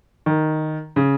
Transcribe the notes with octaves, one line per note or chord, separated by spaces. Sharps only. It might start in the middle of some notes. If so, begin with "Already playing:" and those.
D#3
C#3